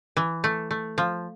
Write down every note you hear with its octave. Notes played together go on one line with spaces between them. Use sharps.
E3
A3
A3
F3